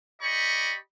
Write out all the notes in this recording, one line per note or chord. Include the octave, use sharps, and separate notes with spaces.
G4 D5 D#5 B5 C#6